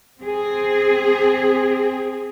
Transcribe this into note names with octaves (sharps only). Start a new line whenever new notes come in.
C4 G#4